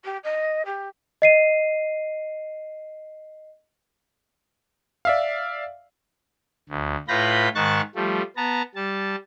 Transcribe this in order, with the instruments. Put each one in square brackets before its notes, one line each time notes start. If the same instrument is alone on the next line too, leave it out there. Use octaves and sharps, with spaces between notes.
[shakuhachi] G4
D#5
G4
[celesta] D#5 C7 D#7
[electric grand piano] D5 E5 F5
[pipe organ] D2
A2 F4 B4 B5 G6 A#6
G#2 D#3 A5 C#6 F#6 A6
F3 G3 A3
B3 A5 A#5
G3 A5